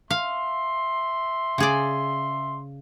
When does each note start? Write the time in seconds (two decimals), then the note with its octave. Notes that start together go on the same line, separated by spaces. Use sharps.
0.10 E5 F5 C6
1.58 C#3 G#4 D5